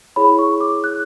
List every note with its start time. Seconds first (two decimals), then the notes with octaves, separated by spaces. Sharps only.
0.16 E4 G#4 C#5 B5
0.39 C#6
0.61 D6
0.84 F#6